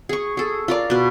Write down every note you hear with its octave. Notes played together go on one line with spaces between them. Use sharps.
G#4 C#6
G#4 A4
F4 A#4 D5
B2 B4